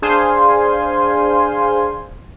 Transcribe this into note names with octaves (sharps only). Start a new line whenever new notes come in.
D4 G#4 C5 F5 G#5 C6